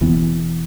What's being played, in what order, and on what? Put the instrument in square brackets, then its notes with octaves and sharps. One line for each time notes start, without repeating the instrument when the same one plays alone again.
[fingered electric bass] E1 E2 E3 B3